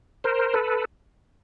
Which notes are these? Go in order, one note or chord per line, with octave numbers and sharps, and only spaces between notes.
A#4 C5
A4 B4